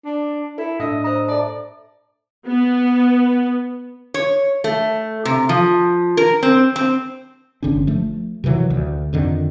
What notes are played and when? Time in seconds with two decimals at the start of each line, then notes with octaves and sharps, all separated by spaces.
0.05 D4
0.58 E4 A4
0.79 A2 D4 D#5 E5
1.04 C5 D#5 A#5
1.28 A4 D5 A5
2.47 B3
4.14 C#5
4.64 A3
5.25 C3
5.49 F3
6.17 A#4
6.43 C4
6.76 C4
7.62 G1 D3 C#4 D4
7.87 F3 A3
8.44 C3 D#3 E3 F#3
8.70 D2
9.13 F2 D3 D#3